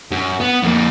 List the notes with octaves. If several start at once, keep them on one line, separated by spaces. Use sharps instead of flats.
F#2
B3
F2 A#3